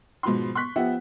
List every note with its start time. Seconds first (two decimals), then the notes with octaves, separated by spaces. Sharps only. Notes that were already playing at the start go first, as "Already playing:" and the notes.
0.23 G#2 B2 F3 B5 C6
0.55 C6 C#6 F#6 B6
0.76 F3 B3 G4 E5 F#5